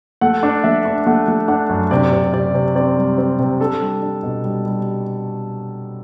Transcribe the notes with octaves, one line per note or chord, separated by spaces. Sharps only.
A3 F#5
D4
A3 E5
D4
A3 F#5
A3
D4 F#5
F#2
C3 D5
C3
C3 D5
C3
C4 D5
G3
C4
C3
D4 A4
G3
D4
B2
G3
G3